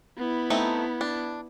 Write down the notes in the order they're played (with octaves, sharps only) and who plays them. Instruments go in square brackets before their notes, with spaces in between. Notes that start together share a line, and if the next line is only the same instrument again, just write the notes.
[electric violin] B3 E4
[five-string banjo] A3 C4 D#4
D4